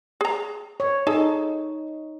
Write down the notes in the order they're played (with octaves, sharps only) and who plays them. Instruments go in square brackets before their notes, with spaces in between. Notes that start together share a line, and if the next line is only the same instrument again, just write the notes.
[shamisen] G#4 A#5
[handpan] C#5
[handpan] D#4 [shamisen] G#4 A4 D#5